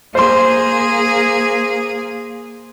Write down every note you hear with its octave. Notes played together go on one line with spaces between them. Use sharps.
A#3 G#4 C5 C6